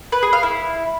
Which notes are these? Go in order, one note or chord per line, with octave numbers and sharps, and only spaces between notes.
B4
G#4
F5
E4